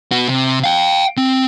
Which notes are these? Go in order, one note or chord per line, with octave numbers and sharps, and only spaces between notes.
B3 F#4
C3
F5 G5
C4